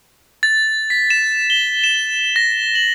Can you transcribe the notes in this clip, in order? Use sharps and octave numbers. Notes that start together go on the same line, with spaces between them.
A6
B6
E7
G7
E7
A#6
F#7